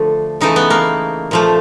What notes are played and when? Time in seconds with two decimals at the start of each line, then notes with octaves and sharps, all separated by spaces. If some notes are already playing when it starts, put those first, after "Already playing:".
Already playing: D3 F3 A3
0.41 C#3 E3 A3 D#4
0.56 B3
0.70 A#3
1.31 A#2 F3 A3